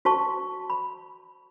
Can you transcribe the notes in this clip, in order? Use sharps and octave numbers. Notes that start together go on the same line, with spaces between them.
F#4 C5 A5 C#6
B5